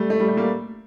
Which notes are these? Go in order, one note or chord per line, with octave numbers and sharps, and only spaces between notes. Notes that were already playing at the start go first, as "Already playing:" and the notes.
Already playing: G3 A3
A3
G3
A3
G3 A#3